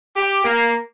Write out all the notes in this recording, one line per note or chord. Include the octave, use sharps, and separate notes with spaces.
G4
A#3